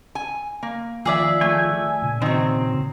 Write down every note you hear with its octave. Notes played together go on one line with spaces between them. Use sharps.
G#5
A#3
D#3 F3 F4 G#4 D5 E5
A3 G#5
A#2 C#3
D#3 F#3 C4